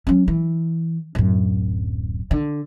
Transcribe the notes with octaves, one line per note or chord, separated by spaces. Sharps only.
F#3 C#4
E3
D1 F#2
D3